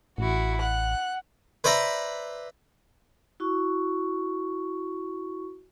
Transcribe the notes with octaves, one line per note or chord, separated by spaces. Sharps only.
A1 E4 F#4
F#5 F#6
B4 C5 D5 E5 A#5
E4 F#4 C#6